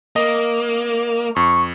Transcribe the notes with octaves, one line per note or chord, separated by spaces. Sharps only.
A#3 D#5
F2 C#6